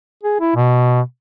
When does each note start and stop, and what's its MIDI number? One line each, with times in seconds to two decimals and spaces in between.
0.23 0.36 68
0.40 0.51 64
0.55 1.01 47